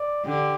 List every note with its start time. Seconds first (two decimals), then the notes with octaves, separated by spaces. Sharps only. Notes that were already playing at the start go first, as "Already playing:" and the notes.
Already playing: D5
0.26 D3 G4